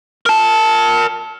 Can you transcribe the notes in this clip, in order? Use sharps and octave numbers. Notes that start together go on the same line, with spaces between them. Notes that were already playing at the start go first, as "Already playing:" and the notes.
A#4 A5